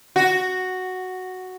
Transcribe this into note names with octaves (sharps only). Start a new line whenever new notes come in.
F#4